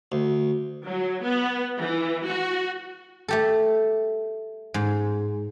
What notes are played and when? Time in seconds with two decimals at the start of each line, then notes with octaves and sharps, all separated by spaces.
0.12 D2
0.86 F#3
1.25 B3
1.79 E3
2.25 F#4
3.28 A3 G4 A4
4.74 G#2